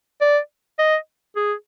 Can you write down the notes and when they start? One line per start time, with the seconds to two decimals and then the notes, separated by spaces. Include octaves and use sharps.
0.21 D5
0.79 D#5
1.36 G#4